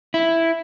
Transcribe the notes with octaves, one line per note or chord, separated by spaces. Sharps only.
E4